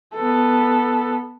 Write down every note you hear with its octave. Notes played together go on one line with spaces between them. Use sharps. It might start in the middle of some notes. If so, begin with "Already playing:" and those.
B3 A4